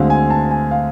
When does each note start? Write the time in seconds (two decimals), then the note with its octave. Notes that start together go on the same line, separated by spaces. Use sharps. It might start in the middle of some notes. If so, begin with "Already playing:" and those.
Already playing: D2 D3 G#3 C4 F5
0.10 G#5
0.30 A5
0.51 G#5
0.71 F5